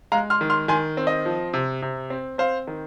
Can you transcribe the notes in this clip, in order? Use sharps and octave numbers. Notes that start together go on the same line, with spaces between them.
G#3 F5 A#5
C6 F6
D#3
C6 F6
D#3 G#5 C6
C4
D#5
F3
C3
C3
C4
C4 C5 F5
D#3